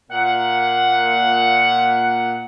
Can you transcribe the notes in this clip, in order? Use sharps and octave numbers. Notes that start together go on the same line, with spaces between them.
A#2 F#5